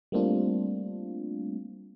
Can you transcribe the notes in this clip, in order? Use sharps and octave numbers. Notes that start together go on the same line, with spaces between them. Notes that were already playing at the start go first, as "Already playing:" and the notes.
G3 A3 A#3 C4 D4 F4